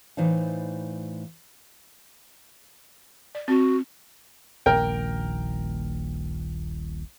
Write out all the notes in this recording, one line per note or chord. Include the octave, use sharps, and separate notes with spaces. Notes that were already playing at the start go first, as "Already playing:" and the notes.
A2 E3 D#4 C5 D5 F5
D5
C4 F#4
D#1 A#1 A#4 G5